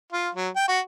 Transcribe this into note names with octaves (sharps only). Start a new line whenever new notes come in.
F4
F#3
G5
F#4